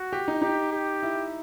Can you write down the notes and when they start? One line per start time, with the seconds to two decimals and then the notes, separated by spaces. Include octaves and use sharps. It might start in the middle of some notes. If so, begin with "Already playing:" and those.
Already playing: F#4
0.13 G4
0.28 D#4
0.42 D#4 G4
0.72 G4
1.03 E4